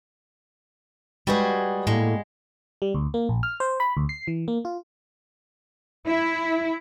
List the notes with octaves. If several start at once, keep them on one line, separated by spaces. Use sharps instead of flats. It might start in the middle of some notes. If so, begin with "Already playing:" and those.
G3 G#3 F#4 G#4 B4 G5
A2 G#3 A#3
G3
D2
A#3
A#1
F6
C5
B5
D2
C7
E3
A#3
F4
E4